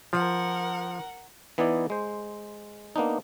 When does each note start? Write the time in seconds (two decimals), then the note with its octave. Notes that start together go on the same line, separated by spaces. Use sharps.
0.13 F3 A#4 F#5
1.58 E3 B3 D#4 E4 D5
1.90 G#3 C5
2.96 A#3 B3 D4 D#4